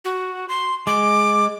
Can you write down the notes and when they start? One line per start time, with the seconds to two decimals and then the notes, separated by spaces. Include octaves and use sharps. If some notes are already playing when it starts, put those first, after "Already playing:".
0.05 F#4
0.49 C6
0.87 G#3 D6